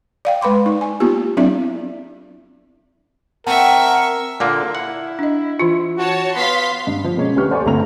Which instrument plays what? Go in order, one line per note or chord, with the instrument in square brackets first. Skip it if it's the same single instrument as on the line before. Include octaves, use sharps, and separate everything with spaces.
[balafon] D5 F5 G5
G#3 B4 B5 C6 D6
D#4
D#4 G#5
A#3 B3 D#4 F4 G4
F#3 C4 D4 E4 D5 E5
[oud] C4 [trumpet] A#4 [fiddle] E5 C#6 [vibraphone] F#5 A5
[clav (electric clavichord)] A#2 D3 A#3
[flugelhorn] E4 [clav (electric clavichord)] F#5
[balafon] D4 D#5
E3 F4
[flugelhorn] F#4 [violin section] C#5 A5
[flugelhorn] B3 [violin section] F5 C6 B6
[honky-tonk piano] G2
F3
B2 G#3 A#3 C#4
D2 G4 B4 C#6 F6
A4 C5 D5 G#5 C#6
G1 D2 A3 C4 A#5 F7